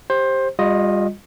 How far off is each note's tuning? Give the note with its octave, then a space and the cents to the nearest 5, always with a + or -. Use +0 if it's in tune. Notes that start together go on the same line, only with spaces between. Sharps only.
G4 +0 C5 +20
G3 +35 F4 +30 D#5 +0